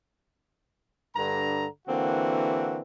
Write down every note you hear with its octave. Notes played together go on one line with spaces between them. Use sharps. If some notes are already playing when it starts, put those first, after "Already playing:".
G2 D3 A#5
D3 E3 A#3 C4 F#4